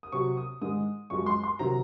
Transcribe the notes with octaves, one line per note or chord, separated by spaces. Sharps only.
D#6
C3 F#3 C#6
D#6
G#2 D#3 G#3 D#6
F#2 F3 G#3 C#6
C6
C6
C3 D#3 F#3 A#5